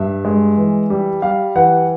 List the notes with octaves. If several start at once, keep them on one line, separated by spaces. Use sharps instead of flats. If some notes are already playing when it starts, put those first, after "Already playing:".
Already playing: G2 E5
G#3
E3
G3
G3 F5
E3 F#5